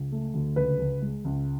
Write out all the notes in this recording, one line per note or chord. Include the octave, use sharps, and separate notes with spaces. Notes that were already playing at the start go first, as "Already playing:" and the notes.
Already playing: C#2
A3
D2
C#2 B4
C#2
G#3
C#2